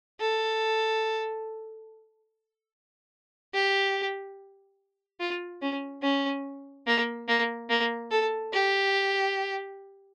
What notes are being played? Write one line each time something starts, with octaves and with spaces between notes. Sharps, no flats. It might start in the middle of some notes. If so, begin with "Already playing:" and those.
A4
G4
F4
C#4
C#4
A#3
A#3
A#3
A4
G4